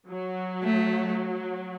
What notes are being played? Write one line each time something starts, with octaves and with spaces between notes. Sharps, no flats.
F#3
A3